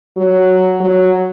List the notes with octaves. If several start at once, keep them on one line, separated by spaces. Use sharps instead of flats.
F#3
F#3